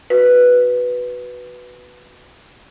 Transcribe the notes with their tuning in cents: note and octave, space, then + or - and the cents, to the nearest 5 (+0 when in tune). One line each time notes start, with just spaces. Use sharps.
F#4 +0 B4 +0